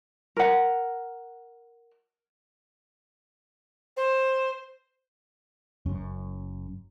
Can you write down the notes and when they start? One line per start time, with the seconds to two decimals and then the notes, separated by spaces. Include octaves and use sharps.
0.36 A#4 F#5
3.97 C5
5.86 F#1 F#2 C#4